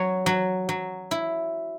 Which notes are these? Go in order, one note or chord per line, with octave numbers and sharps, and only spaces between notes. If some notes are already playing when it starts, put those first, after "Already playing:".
Already playing: F#3 C#5
F#3
F#3
E4